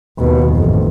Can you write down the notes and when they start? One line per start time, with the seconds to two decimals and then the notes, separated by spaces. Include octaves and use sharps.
0.18 D#2 B2
0.55 A1 F2